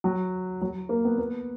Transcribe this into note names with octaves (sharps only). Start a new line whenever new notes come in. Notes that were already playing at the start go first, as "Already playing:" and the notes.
F#3
F#3
A#3
B3
B3